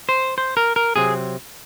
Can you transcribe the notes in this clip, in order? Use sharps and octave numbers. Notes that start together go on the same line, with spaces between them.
C5
C5
A#4
A#4
C3 F#3 C4 G#4